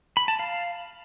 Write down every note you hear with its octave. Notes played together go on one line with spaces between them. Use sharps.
B5
A5
F5